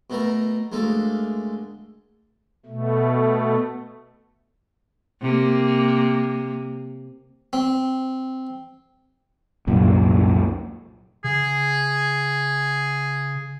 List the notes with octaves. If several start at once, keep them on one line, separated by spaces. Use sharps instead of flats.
B2 A3 A#4 A#5
D2 G#3 A#3 A4
B2 A3
C3 A#3
C4
C2 F#2 A#2
C#3 G#4